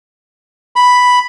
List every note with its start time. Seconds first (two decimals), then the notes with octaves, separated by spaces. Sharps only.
0.76 B5